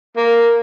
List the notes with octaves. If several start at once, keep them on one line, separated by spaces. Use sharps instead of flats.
A#3